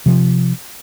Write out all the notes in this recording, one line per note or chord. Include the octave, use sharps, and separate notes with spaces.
C3 F3